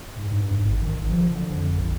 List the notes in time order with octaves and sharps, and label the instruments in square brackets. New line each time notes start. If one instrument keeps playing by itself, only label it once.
[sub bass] G#2
G2
G#2
G#1
D#3
A1
F3
D3
F2
A#1